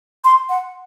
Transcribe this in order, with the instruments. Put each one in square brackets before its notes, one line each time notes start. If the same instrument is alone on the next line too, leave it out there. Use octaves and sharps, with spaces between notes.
[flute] C6
F#5